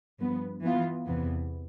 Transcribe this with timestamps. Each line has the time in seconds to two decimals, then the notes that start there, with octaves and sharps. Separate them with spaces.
0.19 G2 F3 B3
0.63 E3 B3 F4
1.07 E2 C3 E3 B3